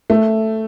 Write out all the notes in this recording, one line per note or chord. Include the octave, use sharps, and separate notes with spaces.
A3